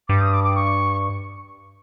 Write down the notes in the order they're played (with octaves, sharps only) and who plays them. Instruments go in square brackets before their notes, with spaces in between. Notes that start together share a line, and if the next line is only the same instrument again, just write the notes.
[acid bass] G2 [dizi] D6
[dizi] D#6
D6
D6
C#6